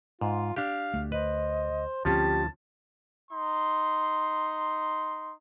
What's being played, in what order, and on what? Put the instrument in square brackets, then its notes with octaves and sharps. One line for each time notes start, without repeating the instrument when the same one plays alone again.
[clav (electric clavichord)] G#2 [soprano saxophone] F4
[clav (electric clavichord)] D4 G4 [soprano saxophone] F5
[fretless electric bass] D2 A3
[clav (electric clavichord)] B4 [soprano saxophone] C5 [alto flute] D#5
[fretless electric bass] D2 C4 [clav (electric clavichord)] F3 C#4 F4 [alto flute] G4 [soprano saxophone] A5
[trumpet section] D#4 C6